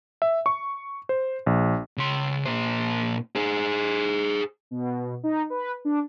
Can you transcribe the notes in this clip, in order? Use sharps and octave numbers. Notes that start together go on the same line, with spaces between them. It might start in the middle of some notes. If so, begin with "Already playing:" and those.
E5
C#6
C5
A#1
C#3 C6
A#2 C5
G#4 C5
B2
D#4
B4
D4